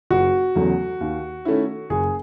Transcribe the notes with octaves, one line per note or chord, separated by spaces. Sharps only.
F#1 F#4
E2 C#3 F#3 A3
D#2
D#3 A3 C#4 E4
F#1 G#4